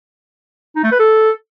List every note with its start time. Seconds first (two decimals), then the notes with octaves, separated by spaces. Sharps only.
0.76 D#4
0.84 A3
0.92 B4
0.99 A4